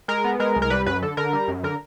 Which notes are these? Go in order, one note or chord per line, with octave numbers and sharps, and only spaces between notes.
G#3 A#4
B3
G#3 A#4
C2
A#4
G3 B4
F#2 B4
D3 A4
D3 A#4
G3
F#2
D3 A#4